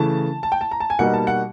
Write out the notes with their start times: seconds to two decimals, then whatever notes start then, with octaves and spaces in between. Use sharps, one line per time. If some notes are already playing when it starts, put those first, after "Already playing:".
Already playing: C#3 E3 A3 A5
0.43 A5
0.52 G5
0.61 A5
0.71 A#5
0.80 A5
0.90 G#5
0.99 B2 G3 A#3 D#4 F#5
1.14 A5
1.27 F#5